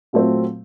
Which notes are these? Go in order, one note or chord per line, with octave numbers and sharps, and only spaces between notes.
A#2 F#3 A3 C4